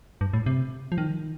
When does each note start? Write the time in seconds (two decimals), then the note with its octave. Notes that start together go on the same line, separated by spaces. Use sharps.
0.21 G2
0.33 A2
0.46 C3
0.92 F3
0.98 D#3